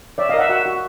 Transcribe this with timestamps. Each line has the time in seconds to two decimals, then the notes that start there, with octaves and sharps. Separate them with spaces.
0.18 C#5 D5 E5
0.29 A#4 D#5 F5
0.39 E5 F#5
0.49 F#4 E5 F#5
0.66 F#4